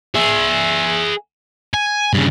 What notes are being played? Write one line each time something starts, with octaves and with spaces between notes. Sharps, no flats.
G#4 E5
G#5
G2 C#3